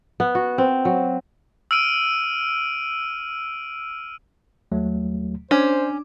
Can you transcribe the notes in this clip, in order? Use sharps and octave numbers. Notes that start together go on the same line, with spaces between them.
B3
F#4
C4
F#3
E6 F6 D7 D#7
D#2 F#3 A3
C#4 D4 C5 D5 D6